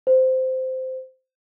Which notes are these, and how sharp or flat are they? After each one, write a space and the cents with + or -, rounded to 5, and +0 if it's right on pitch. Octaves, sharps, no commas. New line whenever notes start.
C5 -15